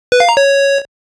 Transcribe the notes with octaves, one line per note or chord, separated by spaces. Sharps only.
B4
F5
A#5
C#5